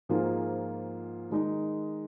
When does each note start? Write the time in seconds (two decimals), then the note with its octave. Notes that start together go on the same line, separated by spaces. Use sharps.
0.09 G#2 F3 A#3 F4 G#4
1.30 D#3 G#3 D#4